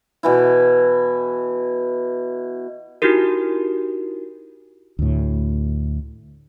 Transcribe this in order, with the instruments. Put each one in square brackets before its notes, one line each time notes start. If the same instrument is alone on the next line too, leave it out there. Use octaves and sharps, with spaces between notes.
[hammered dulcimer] B2 E3 E4
[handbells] D#4 E4 F#4 G4 A#4
[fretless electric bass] D2 A2